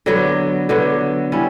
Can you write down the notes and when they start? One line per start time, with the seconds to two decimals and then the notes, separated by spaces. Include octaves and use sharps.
0.06 D3 F#3 B3
0.69 D3 F#3 B3
1.32 G3 C#4 E4